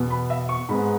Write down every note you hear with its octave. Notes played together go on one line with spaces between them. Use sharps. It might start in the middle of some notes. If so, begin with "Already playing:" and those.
Already playing: E2 B2 B3
B5
E5
C#6
G#2 G#3 B3 B5